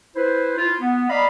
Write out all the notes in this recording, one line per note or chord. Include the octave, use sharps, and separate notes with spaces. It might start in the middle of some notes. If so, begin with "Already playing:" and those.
E4 B4 C5
E4 F4
B3
D5 D#5 F5 A#5 B5